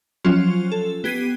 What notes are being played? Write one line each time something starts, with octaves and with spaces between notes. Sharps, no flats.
F3 F#3 C#4 F4
A4
B3 G4 G#6 B6 C7 D#7